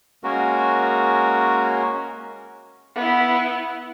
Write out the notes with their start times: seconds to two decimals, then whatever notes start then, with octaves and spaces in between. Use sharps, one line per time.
0.24 G#3 A#3 C#4 F#4 A#4
2.96 B3 E4